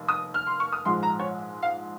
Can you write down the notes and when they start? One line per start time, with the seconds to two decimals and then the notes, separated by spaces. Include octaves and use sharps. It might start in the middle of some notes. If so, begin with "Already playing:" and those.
Already playing: F1 D#2 D#3
0.08 D#6
0.34 F6
0.47 C6
0.60 C#6
0.73 D#6
0.85 A#1 G#2 F3 G#3 C6
1.03 A#5
1.19 C#5
1.63 F5